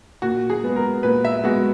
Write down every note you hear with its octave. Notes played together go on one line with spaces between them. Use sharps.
A#2 F#4
G#4
G#3 B3
A#4
A#2 B4
E5
G#3 B3 F#4